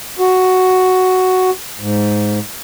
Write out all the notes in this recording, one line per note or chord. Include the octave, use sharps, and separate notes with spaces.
F#4
G#2